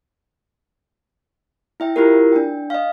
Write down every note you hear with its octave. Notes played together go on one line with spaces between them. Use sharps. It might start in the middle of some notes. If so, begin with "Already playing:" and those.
E4 E5 G5
E4 F4 G4 A#4
D4 G5
D#5 F5